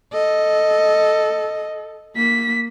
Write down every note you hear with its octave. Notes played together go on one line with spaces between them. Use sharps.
A4 D#5
A#3 B6